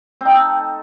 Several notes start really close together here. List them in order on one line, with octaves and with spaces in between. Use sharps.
C4 D#4 A4